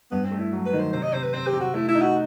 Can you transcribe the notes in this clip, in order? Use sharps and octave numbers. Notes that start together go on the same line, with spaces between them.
G2 B3
C4
A3
E4
F#3
B4
D#3
C5
C3 C5
D#5
C3 C5
B4
C4 C5
G4
C3
F#4
A3 E4
E4
D#4
F#4